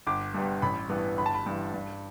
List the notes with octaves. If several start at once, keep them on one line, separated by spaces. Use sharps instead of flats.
G1 D6
G2 G3 B3
A1 B5
G2 E3 B3
G1 B5
A5
B5
G2 E3
G2